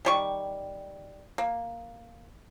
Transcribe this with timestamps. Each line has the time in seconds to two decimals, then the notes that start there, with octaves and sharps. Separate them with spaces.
0.05 D#3 G3 C#6
1.38 A#3